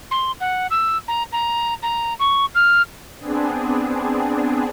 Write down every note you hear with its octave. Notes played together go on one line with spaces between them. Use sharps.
C6
F#5
E6
A#5
A#5
A#5
C#6
F6
B3 C4 D4 G#4